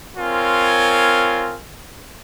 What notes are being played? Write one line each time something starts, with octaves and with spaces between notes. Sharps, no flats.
C4 F4 A#4 C#5 G#5